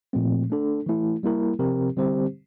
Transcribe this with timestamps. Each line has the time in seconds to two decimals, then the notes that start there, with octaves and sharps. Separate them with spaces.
0.13 A#2 F3 A3 C4
0.50 A3 D4 A4
0.86 E3 A3 E4
1.23 G3 A#3 E4 A#4
1.59 C3 F3 C4 G4 A#4
1.97 D3 G3 C4 G4 C5